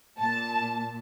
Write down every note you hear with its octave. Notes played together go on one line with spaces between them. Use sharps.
A#2 A5